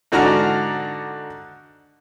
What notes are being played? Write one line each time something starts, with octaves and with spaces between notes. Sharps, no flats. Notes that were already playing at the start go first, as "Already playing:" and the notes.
G#2 D3 F#4 D5 A#5 F6